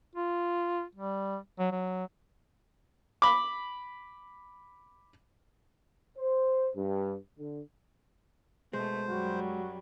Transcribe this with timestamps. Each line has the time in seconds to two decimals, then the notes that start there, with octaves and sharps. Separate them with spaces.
0.15 F4
0.95 G3
1.59 F#3
1.71 F#3
3.22 B5 D6
6.18 C5
6.75 G2
7.38 D3
8.73 B2 G#3 A3 C5
9.08 F#2 F#3 G3 F#4